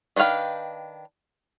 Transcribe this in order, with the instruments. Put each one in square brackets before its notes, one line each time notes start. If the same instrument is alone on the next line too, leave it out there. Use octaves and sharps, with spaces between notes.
[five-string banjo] D#3 D4 B4 F5 G5